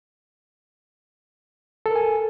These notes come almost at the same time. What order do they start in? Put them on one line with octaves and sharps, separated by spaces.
A4 A#4 G#5